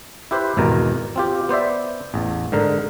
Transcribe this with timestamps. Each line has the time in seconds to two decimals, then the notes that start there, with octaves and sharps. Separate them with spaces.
0.31 E4 G4 B4 C5
0.57 G#1 E2 B2 A#4
1.16 C4 F4 G4
1.49 B3 C5 D5 E5
2.14 A1 E2
2.52 G#2 D3 A#4